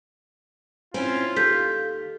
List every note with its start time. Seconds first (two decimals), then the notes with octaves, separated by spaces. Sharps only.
0.94 C4 C#4 E4 F4 G#5
1.36 D#2 G4 A4 G6 B6